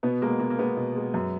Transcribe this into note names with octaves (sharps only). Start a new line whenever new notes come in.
B2 B3
G#3 A#3
B2 A#3
A#3
G#3 B3
B2
G#3
F#2